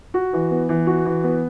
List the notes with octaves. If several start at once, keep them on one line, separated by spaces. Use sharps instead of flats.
F#4
E3
B3
E3
F#4
E3
B3